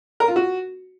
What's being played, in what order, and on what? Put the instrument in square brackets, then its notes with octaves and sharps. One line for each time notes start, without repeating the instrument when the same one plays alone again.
[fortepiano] A#4
F4
F#4